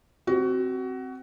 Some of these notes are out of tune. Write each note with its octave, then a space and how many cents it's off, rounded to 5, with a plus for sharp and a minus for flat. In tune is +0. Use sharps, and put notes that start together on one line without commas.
C4 +0 F#4 +20